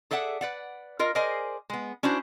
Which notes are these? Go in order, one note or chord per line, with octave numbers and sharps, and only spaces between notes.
G#4 A4 D5 E5 F#5
B4 D5 F#5
F4 A#4 D#5
G#4 A#4 C5 D5 D#5 G#5
G#3 B3
C#4 D4 E4 F#4 C5